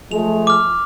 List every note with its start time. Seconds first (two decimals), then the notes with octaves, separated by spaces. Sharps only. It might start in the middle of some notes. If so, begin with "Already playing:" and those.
0.11 F3 G#3 A3 F7
0.47 D6 F6